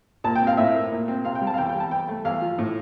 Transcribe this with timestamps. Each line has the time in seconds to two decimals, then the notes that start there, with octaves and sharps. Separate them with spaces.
0.24 A#2 A5
0.35 G5
0.41 C4
0.47 F5
0.57 A2 E5
0.74 A#3
0.91 A#2
1.08 C4
1.25 C3 F5
1.35 G5
1.41 G3
1.47 A5
1.54 F5
1.58 E2 G5
1.69 G5
1.75 G3
1.80 A5
1.91 E2 G5
2.08 A3
2.25 E2 F5
2.42 F3
2.58 A2